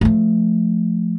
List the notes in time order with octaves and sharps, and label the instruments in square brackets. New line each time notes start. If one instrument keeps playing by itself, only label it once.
[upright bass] F3 A3